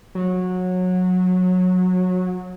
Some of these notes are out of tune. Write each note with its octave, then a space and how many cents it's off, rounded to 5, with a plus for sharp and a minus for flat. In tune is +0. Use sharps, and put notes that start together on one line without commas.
F#3 -20